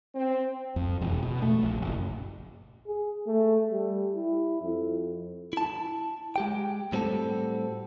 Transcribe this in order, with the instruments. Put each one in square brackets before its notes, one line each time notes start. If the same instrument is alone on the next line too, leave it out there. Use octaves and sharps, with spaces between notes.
[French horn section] C4
[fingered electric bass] F2
E1
B2
A3
A#1
F#1
[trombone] G#4
A3
G3
E4
F2
[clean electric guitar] E4 A5
G#3 G4 G5
A2 G3 C4 F#4 A4